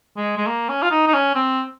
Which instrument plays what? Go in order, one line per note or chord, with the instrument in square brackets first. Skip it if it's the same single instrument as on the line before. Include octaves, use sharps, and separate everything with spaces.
[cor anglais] G#3
G#3
A#3
C#4
F4
D#4
D#4
C#4
C4